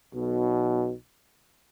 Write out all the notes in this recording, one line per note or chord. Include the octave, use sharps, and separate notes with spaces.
B1 B2